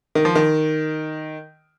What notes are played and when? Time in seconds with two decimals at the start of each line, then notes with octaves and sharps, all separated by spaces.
0.15 D#3
0.25 F3
0.35 D#3